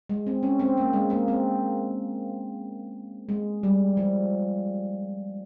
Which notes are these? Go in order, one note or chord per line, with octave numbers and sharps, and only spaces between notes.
G#3
C4
C#4
C4
A#3
G#3
A#3
C4
G#3
G3
F3